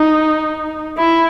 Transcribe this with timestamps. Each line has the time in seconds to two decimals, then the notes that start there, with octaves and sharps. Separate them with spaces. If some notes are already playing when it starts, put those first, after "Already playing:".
Already playing: D#4
0.98 E4